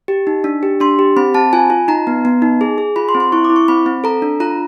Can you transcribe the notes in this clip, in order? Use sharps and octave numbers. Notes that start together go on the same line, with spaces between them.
G4
D#4
D4
G4
D4 C6
G4
C4 B5
C4 A5
F4 G#5
F4
D#4 A#5
B3
B3
D#4
G#4
G#4
F4 B5
C6
C4
C6
E4 C#6
D6
E4
C#6
C4 B5
C4
A4 A#5
D4
F4 A#5